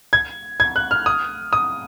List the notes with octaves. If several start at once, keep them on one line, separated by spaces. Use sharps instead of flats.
G#6
G#6
F#6
F6
D#6
D#6